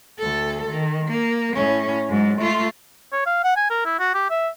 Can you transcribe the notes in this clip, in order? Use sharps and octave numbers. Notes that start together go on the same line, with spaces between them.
D2 A4
D#3
A#3
A2 C#4
G#2 F#3
A3 F4
C#5
F5
F#5
G#5
A#4
E4
F#4
G4
E5